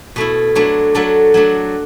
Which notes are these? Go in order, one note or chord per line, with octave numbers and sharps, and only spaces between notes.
B2 A3 E4
F#3 A3 D4
F#3 A3 D4 A4
F#3 A3 D4